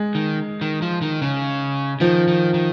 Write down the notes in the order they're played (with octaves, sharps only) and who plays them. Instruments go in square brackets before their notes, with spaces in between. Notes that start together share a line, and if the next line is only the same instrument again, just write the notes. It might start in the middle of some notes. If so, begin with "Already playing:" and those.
Already playing: [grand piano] G#3
[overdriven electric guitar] D#3
D#3
F3
D#3
C#3
[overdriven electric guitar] D#3 [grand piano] F3
[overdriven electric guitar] D#3
D#3